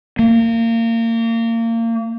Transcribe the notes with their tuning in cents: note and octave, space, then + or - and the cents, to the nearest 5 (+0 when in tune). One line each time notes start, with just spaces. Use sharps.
A#3 -30